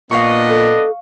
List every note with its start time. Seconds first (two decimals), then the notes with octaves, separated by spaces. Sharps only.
0.11 A#2 B3 D4 D#5 F5 C#6
0.49 A4